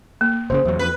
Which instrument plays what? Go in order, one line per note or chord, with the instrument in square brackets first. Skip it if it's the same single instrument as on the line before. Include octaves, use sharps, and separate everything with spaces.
[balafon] A#3
[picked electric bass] F#1 A#2 C#3 [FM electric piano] C5
[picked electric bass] E2 F#3
[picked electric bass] F2 [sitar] B4